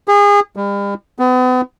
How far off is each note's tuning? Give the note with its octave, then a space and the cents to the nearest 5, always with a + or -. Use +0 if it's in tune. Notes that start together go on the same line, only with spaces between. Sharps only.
G#4 -30
G3 +40
B3 +40